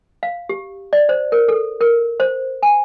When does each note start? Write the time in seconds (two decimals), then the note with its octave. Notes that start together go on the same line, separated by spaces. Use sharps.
0.23 F5
0.49 G4
0.93 D5
1.09 C5
1.32 A#4
1.48 A4
1.81 A#4
2.20 C5
2.63 G#5